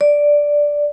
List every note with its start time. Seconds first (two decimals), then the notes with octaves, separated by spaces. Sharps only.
0.01 D5